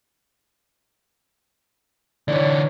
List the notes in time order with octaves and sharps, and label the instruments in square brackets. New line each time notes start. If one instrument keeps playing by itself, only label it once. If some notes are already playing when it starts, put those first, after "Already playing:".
[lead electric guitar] D3 E3 [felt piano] C#5 D5